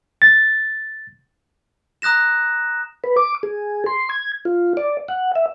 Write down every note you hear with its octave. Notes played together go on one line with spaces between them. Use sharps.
A6
A#5 D#6 F#6 A#6 E7
B4
D6
G#4
C6
G#6
F4
D5
F#5
E5